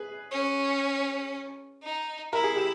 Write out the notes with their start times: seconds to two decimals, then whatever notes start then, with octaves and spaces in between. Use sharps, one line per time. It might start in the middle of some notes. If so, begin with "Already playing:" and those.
Already playing: G#4 B4
0.31 C#4
1.83 D#4
2.33 E4 A#4
2.44 G#4
2.56 G4